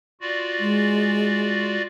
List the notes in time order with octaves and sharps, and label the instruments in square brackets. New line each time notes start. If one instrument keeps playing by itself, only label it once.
[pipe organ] F4 F#4 D5
[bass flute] G#3